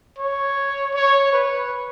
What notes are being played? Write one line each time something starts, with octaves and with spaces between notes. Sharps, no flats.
C#5
C#5
B4